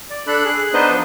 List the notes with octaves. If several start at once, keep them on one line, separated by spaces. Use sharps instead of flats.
D5
D4 A4 B5 F#6
G#4 F#6
B3 D4 D#4 B4 C5 D#5
F3